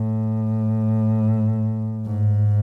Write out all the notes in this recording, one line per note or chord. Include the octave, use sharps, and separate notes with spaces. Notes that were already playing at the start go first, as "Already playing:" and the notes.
Already playing: A2
G#2